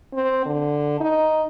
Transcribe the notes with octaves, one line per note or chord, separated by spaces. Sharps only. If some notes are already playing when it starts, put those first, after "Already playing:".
C4
D3
D#4